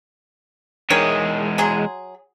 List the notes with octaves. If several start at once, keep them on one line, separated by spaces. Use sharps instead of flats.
E2 D#3 E3 G#3 C#5
F#3 G#4 C6